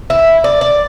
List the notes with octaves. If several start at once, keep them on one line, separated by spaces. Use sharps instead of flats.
E4
D5
D5